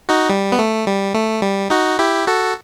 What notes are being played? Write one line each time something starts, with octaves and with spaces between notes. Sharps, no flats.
D#4 F#4
G3
B3
A3
G3
A3
G3
D#4 F#4
E4 G4
F#4 A4